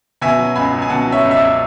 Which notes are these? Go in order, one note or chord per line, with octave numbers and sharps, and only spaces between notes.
B2 E5 G#5
F#3
C#2 G#5 B5
C#2
G#5
B2 F#5 A5
F#3
C#5 E5
C#2
E5
D5
C#2